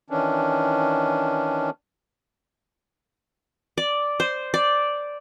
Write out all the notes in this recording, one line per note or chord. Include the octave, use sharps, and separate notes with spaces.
D#3 E3 C#4 D4
D5
C5
D5